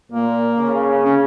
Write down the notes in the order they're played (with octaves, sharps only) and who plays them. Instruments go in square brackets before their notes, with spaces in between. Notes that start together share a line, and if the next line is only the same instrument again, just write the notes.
[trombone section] A#2 [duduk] A#3
[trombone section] C#3
[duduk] C#4